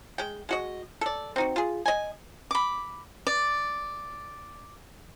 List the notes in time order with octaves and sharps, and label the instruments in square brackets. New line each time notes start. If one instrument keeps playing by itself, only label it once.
[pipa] G#3 G5
G#3 F#4 D#5
A4 D5
C4 D#4 F#4
F4 G#4
D#5 G#5
[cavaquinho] B5 D6
D5